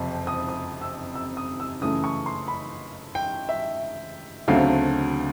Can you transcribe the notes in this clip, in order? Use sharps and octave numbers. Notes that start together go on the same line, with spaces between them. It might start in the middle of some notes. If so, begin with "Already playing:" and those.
Already playing: F#1 F2 C3 F3
D#6
D#6
E6
E6
D#6
E6
F#2 C#3 E3 A3 D#6
C#6
C6
B5
G5
E5
D2 C#3 F#3 A3 C4 F5